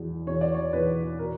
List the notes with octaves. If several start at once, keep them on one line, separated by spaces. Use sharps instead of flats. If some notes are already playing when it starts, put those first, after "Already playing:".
Already playing: E2 B2
E2 C#5
D5
C#5
E2 B4
B2 A#4